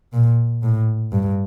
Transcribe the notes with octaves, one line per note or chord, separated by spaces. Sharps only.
A#2
A2
G2